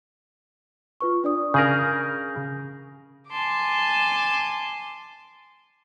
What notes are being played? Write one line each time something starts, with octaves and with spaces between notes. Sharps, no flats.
F4 B4 C#6
D4 D5 D#6
C#3 G#4 A#4 G6 A#6
G#5 A5 C6 D6